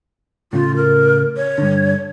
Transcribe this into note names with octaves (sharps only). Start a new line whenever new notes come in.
A2 C#3 F4
A#4
C#5
G2 D3